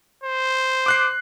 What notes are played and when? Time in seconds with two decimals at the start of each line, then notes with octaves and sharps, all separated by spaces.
0.24 C5
0.86 D6 F#6 C7